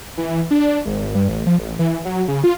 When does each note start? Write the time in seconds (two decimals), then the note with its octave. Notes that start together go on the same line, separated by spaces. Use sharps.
0.17 E3
0.51 D4
0.85 G#1
1.15 G2
1.29 A1
1.47 F3
1.59 A1
1.79 E3
2.05 F#3
2.28 C#3
2.44 F4